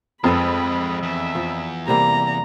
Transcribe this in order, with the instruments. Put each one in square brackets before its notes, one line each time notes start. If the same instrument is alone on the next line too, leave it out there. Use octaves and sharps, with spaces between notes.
[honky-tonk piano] F2 [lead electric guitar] G#3 C4 [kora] F4 A4 B4 [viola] B5
[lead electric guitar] E2 [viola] E5
[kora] F3
[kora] C3 G3 A#3 [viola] A#5